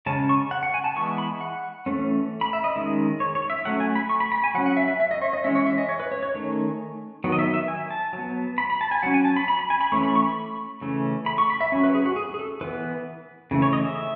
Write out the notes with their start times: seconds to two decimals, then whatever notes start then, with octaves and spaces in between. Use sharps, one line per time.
0.06 C#3 G#3 C#4 A5
0.29 C#6
0.51 F#5
0.63 F#5
0.74 G#5
0.84 A5
0.96 E3 G#3 B3 C#6
1.18 B5
1.41 F#5
1.86 E3 A3 C#4
2.41 B5
2.53 E5
2.64 D#5
2.76 D#3 G#3 C#4
3.20 C#5
3.35 C#5
3.50 E5
3.65 F#3 A3 C#4 F#5
3.80 G#5
3.95 B5
4.09 C#6
4.20 B5
4.32 B5
4.44 G#5
4.54 F#3 F#5
4.58 C#4
4.66 F#5
4.77 E5
4.88 E5
5.00 E5
5.11 D#5
5.21 C#5
5.33 D#5
5.44 E3 G#3 C#4 E5
5.55 C#5
5.66 E5
5.78 D#5
5.89 C#5
6.00 B4
6.12 C#5
6.23 C#5
6.34 D#3 A3 C#4
7.24 D#3 F#3 B3
7.32 D#5
7.39 E5
7.54 E5
7.68 G#5
7.91 A5
8.13 F#3
8.18 B3
8.58 B5
8.70 B5
8.81 A5
8.91 G#5
9.02 F#3 C#4 F#5
9.14 G#5
9.25 A5
9.36 B5
9.48 B5
9.59 B5
9.70 G#5
9.81 B5
9.92 E3 A3 C#4 C#6
10.03 B5
10.15 C#6
10.26 B5
10.81 C#3 E3 A3 C#4
11.26 B5
11.38 C#6
11.50 B5
11.61 E5
11.72 F#3 C#4
11.84 B4
11.95 G#4
12.06 F#4
12.16 G#4
12.34 G#4
12.39 A4
12.61 E3 B3 B4
13.51 C#3 E3 A3
13.62 C#5
13.73 D#5
13.85 E5